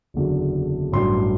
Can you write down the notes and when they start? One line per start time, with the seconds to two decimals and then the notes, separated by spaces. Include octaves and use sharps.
0.14 F#1 E2 D3 F#3
0.92 A1 G2 F#3 C6